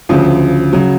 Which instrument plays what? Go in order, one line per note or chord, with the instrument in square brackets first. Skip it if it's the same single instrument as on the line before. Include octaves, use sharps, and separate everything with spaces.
[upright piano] D2 C#3 F3
C#3 F#3